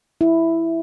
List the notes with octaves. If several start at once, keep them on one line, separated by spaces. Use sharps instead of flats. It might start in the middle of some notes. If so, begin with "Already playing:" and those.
E4